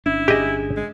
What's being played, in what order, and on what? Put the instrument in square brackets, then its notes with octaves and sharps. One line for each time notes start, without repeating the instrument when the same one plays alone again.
[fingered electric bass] G1 C#4 D4 [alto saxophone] E4
[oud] G#3 [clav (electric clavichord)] G4 D#5
[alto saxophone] G#3